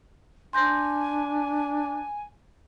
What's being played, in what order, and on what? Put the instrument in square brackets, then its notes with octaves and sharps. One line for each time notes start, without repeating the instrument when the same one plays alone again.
[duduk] D4 [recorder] G#5 [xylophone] C6 G6 A#6